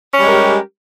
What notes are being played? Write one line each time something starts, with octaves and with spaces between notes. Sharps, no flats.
G3 G#3 C#4 G4 A#4